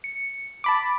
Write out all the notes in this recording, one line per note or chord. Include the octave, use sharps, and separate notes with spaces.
C#7
A5 B5 D6